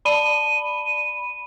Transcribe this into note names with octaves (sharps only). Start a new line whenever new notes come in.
D5 A5 B5 D#7